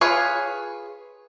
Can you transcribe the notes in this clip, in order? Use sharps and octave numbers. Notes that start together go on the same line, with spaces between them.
F4 G#4 B4 C#5 F5